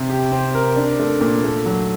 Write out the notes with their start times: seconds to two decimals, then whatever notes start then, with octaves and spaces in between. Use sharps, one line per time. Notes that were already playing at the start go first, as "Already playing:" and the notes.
Already playing: C3
0.10 G4
0.32 C4
0.55 A#4
0.76 D4
0.99 A3
1.21 A#2
1.44 A3
1.66 F#3